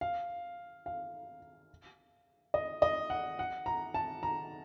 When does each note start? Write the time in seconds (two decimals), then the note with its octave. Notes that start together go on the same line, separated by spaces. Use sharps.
0.01 F5
0.86 F5
2.54 D#5
2.82 D#5
3.10 F#5
3.39 F#5
3.66 A#5
3.94 A5
4.23 A#5